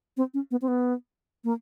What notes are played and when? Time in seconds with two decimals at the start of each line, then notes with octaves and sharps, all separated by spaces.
0.17 C4
0.34 C#4
0.51 B3
0.62 C4
0.68 B3
1.44 A#3